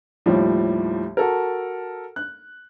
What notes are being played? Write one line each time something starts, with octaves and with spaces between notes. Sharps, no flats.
D#2 A2 F3 G3
F#4 A4 A#4
F#6